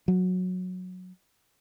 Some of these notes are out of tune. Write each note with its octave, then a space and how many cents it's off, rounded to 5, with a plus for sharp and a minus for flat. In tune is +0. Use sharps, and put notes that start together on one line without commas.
F#3 -15